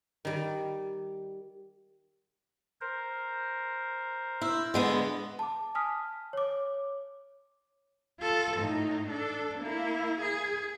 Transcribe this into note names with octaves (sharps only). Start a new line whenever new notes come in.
D#3 G3
A#4 C5
E4
D3 G#3 B3
A5 D6
G#5 A5 D#6 F6 B6
C#5 D6
F4 A4
A2 D#4
D4 A4
A#3 E4
G#4